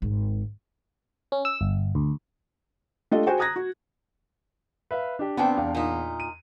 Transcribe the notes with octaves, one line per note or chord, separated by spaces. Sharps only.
G#1
C#4
E6
G1
D2
A3 D4 F4 G4 A4 D#5
F#4 G#4 C5 G5 G#5
A#5 D#6 F#6 G#6 A#6
F#4
B4 E5 F5
D4 G4
C3 B3 C4 D4 G5
E2 F5
A#2 D#4
D#7